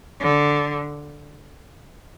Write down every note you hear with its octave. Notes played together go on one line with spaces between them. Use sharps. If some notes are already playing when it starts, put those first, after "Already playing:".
D3